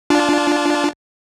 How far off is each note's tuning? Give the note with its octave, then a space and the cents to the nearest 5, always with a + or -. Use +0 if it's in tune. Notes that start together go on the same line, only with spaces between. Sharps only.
D4 +0 F4 +0 A5 -30